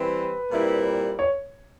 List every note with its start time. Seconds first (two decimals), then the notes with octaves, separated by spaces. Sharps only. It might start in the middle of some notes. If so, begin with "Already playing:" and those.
Already playing: E3 G3 C4 B4
0.51 A#2 G3 C4 E4
1.19 C#5